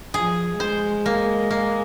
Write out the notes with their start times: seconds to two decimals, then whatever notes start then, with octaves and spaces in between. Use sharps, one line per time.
0.14 F3 G#4
0.60 G#3 C5
1.06 A#3
1.51 A#3